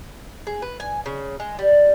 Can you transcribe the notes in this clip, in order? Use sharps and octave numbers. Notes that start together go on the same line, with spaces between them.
G#4
B4
G#5
C#3
G#3
G3